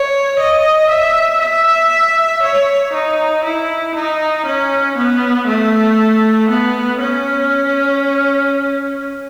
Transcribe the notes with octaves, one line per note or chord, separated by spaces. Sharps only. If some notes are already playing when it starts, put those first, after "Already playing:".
Already playing: C#5
D#5
E5
E5
C#5
D#4
E4
D#4
C#4
B3
A3
B3
C#4